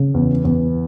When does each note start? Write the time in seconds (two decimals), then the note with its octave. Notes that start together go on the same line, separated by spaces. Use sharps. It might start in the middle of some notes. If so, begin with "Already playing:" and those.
Already playing: C#3
0.14 E2
0.45 E2